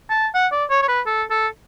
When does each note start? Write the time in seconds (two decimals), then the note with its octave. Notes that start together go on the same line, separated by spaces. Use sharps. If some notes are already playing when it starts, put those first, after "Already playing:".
0.10 A5
0.34 F#5
0.52 D5
0.70 C#5
0.82 C#5
0.88 B4
1.06 A4
1.30 A4